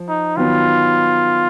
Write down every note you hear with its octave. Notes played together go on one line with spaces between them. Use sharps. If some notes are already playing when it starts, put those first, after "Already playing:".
Already playing: F3
D#4
D#3 F#3 B3 F4